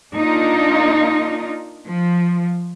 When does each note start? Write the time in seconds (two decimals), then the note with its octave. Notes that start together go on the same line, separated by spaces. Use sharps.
0.14 A#3 D4 D#4 F4
1.87 F3